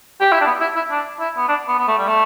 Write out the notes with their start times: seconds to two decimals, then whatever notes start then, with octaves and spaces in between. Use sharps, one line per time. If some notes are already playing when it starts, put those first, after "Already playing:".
0.21 G4
0.32 E4
0.40 D4
0.46 B3
0.60 E4
0.75 E4
0.91 D4
1.19 E4
1.37 B3
1.48 D4
1.68 B3
1.78 B3
1.88 A3
1.98 G3
2.07 A3